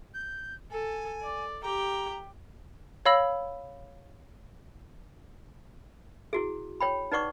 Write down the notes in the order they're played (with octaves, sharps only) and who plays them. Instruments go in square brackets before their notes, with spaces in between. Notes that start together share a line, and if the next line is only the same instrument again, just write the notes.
[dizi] G6
[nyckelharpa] A4 [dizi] G#5
[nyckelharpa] D5
[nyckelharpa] G4 G5 [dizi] A#5
[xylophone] C#5 F5 B5 E6 A#6 F#7
[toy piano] E4 F#4 G#4
C#5 G5 B5
D#4 B4 D5 F#5 C#6 D6